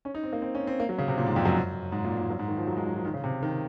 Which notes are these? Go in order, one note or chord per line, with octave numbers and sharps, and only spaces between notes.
C#4
D#4
C4
A#3
C4
C#4
C4
A#3
F#3
C#3
C3
A#2
G#2
F2
F#2
G#2
A#2
A#2
F#2
G#2
D#3
F3
F#3
G#3
F#3
F3
D#3
C#3
C3
D#3